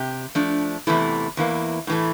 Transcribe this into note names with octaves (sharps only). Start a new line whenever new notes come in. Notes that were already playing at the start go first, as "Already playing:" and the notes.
Already playing: C3 G4
F3 A3 D4
E2 C3 E3 A3 E4
E2 E3 A#3
A2 E3 A3